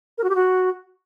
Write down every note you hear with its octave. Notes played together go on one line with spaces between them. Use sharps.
A#4
F#4
G4
F#4